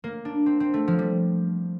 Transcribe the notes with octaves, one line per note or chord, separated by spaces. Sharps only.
A#3
D4
C4
C4
A3
F3
G3